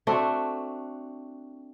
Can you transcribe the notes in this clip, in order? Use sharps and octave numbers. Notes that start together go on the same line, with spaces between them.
A3 C4 D4 F#4